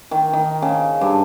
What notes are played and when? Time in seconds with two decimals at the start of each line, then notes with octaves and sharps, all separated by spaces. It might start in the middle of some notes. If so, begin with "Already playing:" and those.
0.11 D#3
0.33 D#3
0.62 C#3
1.01 G2